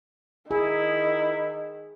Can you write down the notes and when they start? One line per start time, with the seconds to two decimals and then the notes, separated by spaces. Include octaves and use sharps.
0.51 D#3 E4 G#4